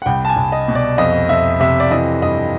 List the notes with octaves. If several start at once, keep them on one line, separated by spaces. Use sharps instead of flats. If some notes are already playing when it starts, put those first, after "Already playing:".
F#5
C2 G5
A5
G#5
C2
D#5
B2
D5
F2 D#5
F2 E5
C3 E5
D5
E3 D#5
G2 D#5